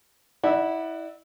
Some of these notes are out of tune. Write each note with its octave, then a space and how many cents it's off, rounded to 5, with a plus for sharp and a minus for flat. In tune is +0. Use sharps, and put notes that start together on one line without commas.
E4 -20 D5 +25 F#5 +0